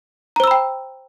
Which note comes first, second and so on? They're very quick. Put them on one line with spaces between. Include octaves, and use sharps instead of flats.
A#5 C5 E6 B5 G5